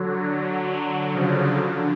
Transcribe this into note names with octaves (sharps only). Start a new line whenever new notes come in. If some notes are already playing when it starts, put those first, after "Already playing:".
Already playing: D3 F#3
D3 F#3
C#3 F3
D3